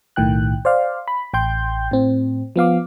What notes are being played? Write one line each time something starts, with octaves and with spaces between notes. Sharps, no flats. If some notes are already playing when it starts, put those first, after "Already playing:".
B1 A2 D#3 G5 F#6
C5 D5 F5
B5
A1 G5 C6 G6
A2 C4
F3 B3 F5 D6